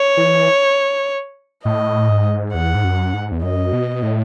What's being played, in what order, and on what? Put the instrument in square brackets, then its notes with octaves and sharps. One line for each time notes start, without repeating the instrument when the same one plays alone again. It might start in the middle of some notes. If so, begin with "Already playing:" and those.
Already playing: [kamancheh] C#5
[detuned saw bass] E3
[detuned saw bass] A2 [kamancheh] D#5
[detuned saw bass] G#2
[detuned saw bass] E2 [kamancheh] F#5
[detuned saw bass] G#2
F#2
G#2
E2
[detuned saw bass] F#2 [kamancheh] D#5
[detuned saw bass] B2
A2